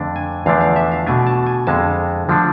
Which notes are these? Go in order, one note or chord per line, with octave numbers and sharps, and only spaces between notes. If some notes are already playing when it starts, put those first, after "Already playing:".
Already playing: F2 D3 A3 D4
G#5
E2 D3 F3 A3 D4 F5
F5
E5
F5
B2 A3 D4 G#5
A5
G#5
F2 D3 G#3 A5
D3 F3 A3 D4